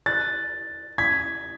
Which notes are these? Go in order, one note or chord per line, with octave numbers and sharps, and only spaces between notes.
F#6 A6
G#6 B6